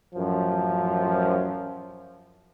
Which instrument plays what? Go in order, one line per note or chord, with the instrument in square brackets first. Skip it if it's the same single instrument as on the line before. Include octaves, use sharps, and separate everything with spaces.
[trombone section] A1 F#2 F3